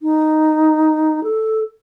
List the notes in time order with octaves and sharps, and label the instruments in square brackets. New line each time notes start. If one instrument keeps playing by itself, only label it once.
[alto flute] D#4
A4